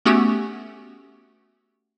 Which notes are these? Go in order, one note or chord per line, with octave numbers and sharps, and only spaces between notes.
A3 B3 C#4 F#4 G4